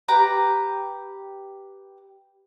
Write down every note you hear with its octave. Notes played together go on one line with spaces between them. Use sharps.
G4 B4 A#5